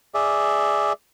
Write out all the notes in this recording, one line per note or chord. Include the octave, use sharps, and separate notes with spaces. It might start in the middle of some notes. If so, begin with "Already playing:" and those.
G#4 D5 E5